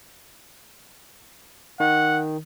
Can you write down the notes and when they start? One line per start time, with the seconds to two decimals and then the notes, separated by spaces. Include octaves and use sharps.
1.80 D#3 F#5